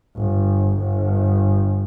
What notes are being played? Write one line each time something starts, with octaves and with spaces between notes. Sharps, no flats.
G1
G1